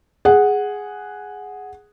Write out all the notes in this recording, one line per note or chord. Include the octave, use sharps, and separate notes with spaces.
G#4 F#5